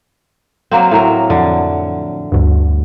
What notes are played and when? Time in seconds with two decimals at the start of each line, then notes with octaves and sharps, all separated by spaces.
0.71 F#3 A#3 C4
0.91 A2 F#3 A#4
1.30 F2 D3
2.32 D2 G2